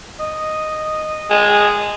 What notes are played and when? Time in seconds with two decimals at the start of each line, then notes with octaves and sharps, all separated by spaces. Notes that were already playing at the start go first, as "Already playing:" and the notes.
0.19 D#5
1.31 G#3